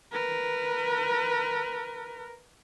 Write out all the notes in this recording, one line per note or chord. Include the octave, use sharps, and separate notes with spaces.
A#4 B4